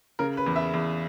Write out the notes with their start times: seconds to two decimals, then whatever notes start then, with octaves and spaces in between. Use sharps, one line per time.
0.19 C#3 A#4
0.37 B4
0.46 E2
0.56 E5
0.74 E2